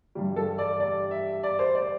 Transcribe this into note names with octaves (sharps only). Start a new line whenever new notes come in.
G2 E3 G3
A4
D5
D5
E5
D5
C5
D5